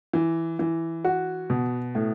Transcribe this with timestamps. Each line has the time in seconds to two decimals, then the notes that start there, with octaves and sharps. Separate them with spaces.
0.13 E3
0.59 E3
1.05 F#4
1.50 B2
1.95 A2